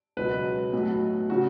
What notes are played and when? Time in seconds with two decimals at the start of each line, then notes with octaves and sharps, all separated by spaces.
0.17 C#2 B2 F#3 B4
0.73 B1 A2 F#3
1.30 C#3 F#3 F#4